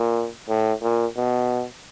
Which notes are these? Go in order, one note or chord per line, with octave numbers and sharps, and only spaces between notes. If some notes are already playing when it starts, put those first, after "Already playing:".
Already playing: A#2
A2
A#2
B2